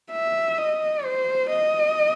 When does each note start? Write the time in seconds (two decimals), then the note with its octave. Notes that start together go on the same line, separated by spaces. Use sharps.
0.12 E5
0.58 D#5
1.04 C5
1.50 D#5